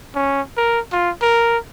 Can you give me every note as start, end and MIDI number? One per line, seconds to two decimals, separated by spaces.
0.15 0.41 61
0.57 0.79 70
0.92 1.10 65
1.22 1.57 70